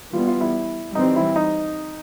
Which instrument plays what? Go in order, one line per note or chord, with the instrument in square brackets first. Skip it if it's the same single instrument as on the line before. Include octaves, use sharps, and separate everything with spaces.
[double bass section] E3 G3 B3 [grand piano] F4
[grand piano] F4
E4
[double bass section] E3 G3 C4 [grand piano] D#4
[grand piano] E4
D#4